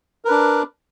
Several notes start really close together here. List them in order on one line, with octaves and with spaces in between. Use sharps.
A#4 B4 D4